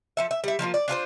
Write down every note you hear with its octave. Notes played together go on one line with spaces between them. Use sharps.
F3 A4 E5
E5
G3 E4
F3 A#3 D#4 F4
D5
D4 F4 A4 C5